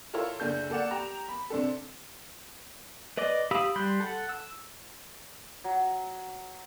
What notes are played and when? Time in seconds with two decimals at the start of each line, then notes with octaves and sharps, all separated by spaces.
0.13 E4 F4 A4 A#4 C#5
0.40 F#1 D4 A4 G6
0.70 A#3 A4 D5 F#5 E7
0.91 G4 G5 A#5 D6
1.28 B5
1.50 C3 D4 A4
3.17 B4 D5 D#5 D6
3.51 G4 F5 B5 D#6 E6
3.76 G3 B5 C6 F#6 G6
4.00 A4 F#5
4.29 E6
5.64 F#3